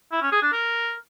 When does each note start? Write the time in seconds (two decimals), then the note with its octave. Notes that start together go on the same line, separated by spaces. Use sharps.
0.12 E4
0.22 C#4
0.32 G#4
0.42 D4
0.52 A#4